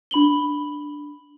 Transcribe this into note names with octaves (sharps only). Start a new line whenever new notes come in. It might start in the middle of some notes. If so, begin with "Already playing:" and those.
D4 B5 F#7 G7